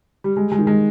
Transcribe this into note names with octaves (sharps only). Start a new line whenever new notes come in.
G3
G3 G#3
G#3
D#3
G#3